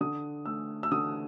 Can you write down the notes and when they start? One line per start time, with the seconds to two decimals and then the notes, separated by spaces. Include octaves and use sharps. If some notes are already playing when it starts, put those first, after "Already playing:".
0.01 D3 D#6
0.46 A3 E6
0.83 E6
0.92 D3 D#6